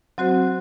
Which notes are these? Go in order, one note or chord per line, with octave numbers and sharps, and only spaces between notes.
F#3 C4 F#4 C5